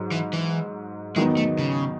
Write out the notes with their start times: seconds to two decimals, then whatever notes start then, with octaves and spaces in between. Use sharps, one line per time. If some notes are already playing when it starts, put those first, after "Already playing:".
Already playing: G#2 F#3
0.12 E3
0.33 E3
1.16 E2 D#3 F#3 G#3 B3 D#4
1.37 A3
1.59 C#3